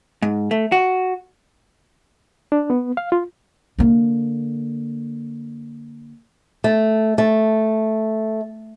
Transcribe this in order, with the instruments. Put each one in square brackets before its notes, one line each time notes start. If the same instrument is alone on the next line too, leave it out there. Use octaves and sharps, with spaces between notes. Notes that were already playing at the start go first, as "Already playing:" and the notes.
[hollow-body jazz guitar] G#2
A3
F#4
[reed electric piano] D4
B3
F5
F4
[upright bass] D3 A#3
[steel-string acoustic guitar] A3
A3